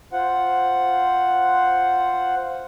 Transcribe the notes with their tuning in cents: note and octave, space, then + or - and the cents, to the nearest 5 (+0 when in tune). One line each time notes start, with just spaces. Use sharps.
F4 +0 C5 +0 F#5 +0